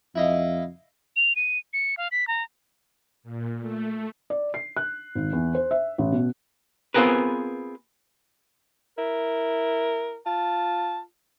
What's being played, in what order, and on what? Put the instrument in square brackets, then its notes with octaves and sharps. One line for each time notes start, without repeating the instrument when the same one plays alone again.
[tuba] F2 [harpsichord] E4 D#5 F5
[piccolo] F7
D#7
C#7
F5
B6
A#5
[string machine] A#2
A3
[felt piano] D5
C7
F#6
G#1
E2
C5
E5
A1
B2
[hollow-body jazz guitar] B3 C4 F4 G#4 A#4 B4
[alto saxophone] E4 [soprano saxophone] A#4
[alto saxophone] F4 [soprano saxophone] A5